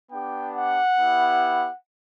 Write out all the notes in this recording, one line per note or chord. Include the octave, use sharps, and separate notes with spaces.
B3 D4 G4 G5
F#5
B3 E4 G4